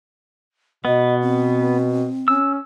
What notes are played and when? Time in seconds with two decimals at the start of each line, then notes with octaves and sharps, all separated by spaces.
0.85 B2 B3 D#5
1.22 C4
2.28 C#4 E6